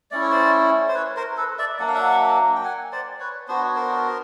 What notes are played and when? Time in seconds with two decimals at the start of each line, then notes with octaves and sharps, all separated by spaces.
0.11 A3 C#4 E4 D5
0.22 C#5
0.31 C5 D5
0.88 C5
0.95 B4 C#5
1.17 A#4 C5
1.37 A4 B4
1.59 D5 E5
1.80 F#3 A#3 D4 F#5
1.88 F5
1.95 E5 F#5
2.56 G5
2.64 F#5 G#5
2.92 C5 D5
3.20 B4 C#5
3.48 B3 D4 F#4 C5
3.62 C#5
3.76 A#4 C5